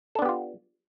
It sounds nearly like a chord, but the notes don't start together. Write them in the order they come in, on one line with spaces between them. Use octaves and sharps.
A4 D4 B3 G4 F4